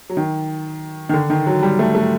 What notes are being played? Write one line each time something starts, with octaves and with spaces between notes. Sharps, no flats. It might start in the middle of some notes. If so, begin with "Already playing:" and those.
F#3
D#3
D#3
D3
D#3
F#3
G3
A3
A3